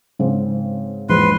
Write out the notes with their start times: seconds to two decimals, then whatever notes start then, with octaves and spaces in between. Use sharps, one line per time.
0.19 G#2 C#3 C4
1.09 A#1 E2 G#2 B4 C6